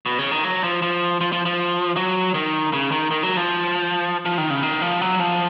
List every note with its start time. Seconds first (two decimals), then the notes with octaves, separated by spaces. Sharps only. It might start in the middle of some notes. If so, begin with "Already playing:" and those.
0.06 B2
0.19 C#3
0.31 D#3
0.44 F#3
0.64 F3
0.82 F3
1.21 F3
1.32 F3
1.46 F3
1.96 F#3
2.34 D#3
2.73 C#3
2.92 D#3
3.11 D#3
3.23 F#3
3.37 F3
4.25 F3
4.38 D#3
4.50 C#3
4.63 D#3
4.82 F3
5.01 F#3
5.20 F3